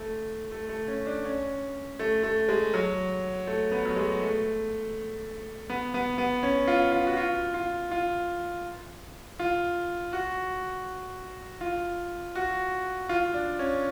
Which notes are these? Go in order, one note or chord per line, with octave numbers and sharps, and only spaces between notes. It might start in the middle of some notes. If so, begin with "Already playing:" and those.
Already playing: A3
A3
A3
C#4
D4
C#4
A3
A3
G#3
F#3
A3
B3
F#3
G#3
A3
B3
B3
B3
C#4
F4
F4
F#4
F4
F4
F4
F4
F#4
F4
F#4
F4
D4
C#4